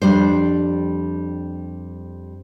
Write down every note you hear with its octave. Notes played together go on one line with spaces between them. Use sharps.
F2 G3 D4 C5